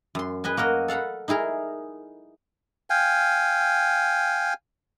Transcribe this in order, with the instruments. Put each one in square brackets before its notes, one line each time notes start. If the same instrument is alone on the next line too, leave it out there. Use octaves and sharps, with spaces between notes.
[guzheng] F#2 C6
G#4 B4 D#5 G#5
A#3 F#4 A#4 D#5
A4 F5 F#5 A#5 B5
D#4 E4 G#4 A#4
[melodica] F5 G5 G#5